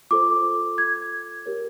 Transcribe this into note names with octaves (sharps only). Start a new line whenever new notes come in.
F4 A4 C5 D6
G#6
G4 A#4 C#5